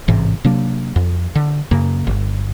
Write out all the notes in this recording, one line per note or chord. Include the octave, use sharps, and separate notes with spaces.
A1 G#2 C3 E3
C3 F#3 A#3 D4
F2
D3
F#2 C#3 A#3
G1